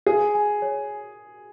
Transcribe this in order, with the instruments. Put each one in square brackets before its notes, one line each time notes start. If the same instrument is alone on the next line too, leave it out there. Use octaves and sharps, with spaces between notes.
[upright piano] G#4 [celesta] G#5
[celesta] G#5
C#5